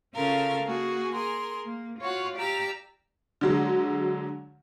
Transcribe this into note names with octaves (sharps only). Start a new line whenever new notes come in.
C#3 C#4 F4 A4 A#4 F5
A#3 F#4 G#4
G#4 A#4 C6
A#3
F4 F#4 C#5 F5 F#5
G4 D5 F5 A#5 E6
D3 F#3 G#3